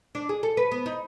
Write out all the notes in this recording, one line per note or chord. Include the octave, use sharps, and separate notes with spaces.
D4
G#4
A4
B4
B3
D#4